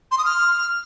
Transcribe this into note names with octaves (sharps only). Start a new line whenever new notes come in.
C6
D#6
F6